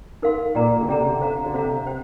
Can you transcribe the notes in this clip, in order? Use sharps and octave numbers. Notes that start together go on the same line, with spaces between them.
D#4 A#4 F5 C6
A#2 G#4 D5 G5 A#5
D3
C3 G#4 D5 G5 A#5
C3
D3
C5 F5 A#5
D3
C3 C5 F5 A#5
C5 G5